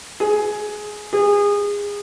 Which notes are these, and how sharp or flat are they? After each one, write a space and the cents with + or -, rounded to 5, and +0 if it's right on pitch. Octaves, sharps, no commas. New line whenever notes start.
G#4 +15
G#4 -25